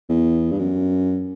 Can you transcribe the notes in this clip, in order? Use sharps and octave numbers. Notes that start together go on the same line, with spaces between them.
E2
G2
F#2